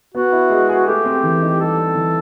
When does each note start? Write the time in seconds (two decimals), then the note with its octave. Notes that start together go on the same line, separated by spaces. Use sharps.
0.14 B3 F#4
0.32 E4
0.50 G#3
0.69 G#4
0.87 A3 G4
1.05 C4
1.23 E3
1.42 D#4
1.59 G3 A4
1.77 C4
1.95 E3